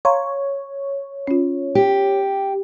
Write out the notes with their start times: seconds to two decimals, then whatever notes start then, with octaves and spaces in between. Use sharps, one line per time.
0.05 C#5 F5 A#5 C6
1.27 C#4 F4
1.75 G4